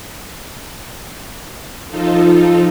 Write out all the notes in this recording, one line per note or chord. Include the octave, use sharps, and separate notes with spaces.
F3 D#4 F4 A4